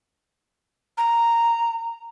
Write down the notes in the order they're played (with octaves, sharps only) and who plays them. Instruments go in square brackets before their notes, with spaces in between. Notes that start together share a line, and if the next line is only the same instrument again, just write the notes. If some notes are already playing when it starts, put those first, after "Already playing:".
[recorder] A#5